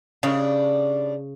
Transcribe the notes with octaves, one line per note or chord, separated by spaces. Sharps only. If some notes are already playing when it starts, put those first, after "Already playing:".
A2 C#3 G3 D4